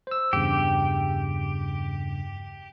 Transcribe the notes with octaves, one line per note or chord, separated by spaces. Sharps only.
C5 E6
E2 G2 C#3 G4